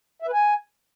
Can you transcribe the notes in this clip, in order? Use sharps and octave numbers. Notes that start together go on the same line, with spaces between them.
E5
B4
G#5